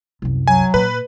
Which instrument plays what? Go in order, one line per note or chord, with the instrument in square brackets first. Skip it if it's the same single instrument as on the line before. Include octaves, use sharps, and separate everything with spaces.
[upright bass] C2 F#2
[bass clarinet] F#3 [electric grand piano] G#5
[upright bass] A#2 [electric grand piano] B4